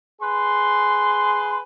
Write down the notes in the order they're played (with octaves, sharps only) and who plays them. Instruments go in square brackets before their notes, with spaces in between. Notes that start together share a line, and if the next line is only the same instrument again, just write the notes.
[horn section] G#4 B4 C6